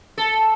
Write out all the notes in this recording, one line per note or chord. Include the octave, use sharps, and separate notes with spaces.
A4